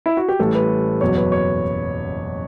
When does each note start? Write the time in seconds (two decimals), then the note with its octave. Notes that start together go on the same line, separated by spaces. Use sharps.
0.06 E4
0.17 F#4
0.29 G4
0.39 A1 A2 E3 G3 A4
0.55 B4
1.01 F#1 E2 B2 F#3 C#5
1.17 B4
1.32 C#5